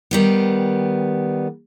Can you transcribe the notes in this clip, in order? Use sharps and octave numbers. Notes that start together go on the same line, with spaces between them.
D#3 G3 B3